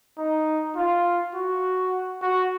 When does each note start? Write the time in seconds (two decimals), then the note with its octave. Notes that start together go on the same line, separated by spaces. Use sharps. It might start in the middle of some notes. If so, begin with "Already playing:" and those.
0.17 D#4
0.76 F4
1.34 F#4
2.22 F#4